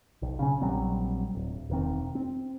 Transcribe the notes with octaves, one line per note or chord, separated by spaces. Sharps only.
B1
C#3 C#4
A#1 F#3 G3 C4
D1
E1 D#3 C4
C4